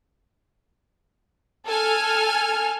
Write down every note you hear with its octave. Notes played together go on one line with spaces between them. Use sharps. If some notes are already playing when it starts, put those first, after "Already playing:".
A4 G#5 F6